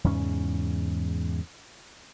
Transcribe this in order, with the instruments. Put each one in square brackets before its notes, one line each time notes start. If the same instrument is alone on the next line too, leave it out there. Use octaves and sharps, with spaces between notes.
[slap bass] E2 G#2 C#3 C#4